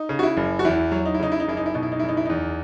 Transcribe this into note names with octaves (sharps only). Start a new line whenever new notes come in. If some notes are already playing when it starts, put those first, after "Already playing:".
Already playing: D#4
C#3
F#4
E4
F#1
F#4
E2 E4
F#3
D#4
E4
C#3 D#4
E4
D#4
F#1 E4
D#4
E4
B2 D#4
E4
D#4
F#1 E4
D#4
E4
E2 D#4